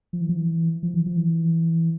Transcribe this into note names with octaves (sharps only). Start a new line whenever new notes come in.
F3
E3
F3
E3
F3
E3
F3
E3